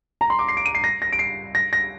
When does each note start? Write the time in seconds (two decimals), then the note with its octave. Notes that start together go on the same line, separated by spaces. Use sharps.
0.21 A#5
0.30 C6
0.39 D6
0.48 C7
0.57 D7
0.66 D#7
0.75 C7
0.84 A#6
1.02 A#6
1.12 D7
1.19 C7
1.55 A#6
1.73 A#6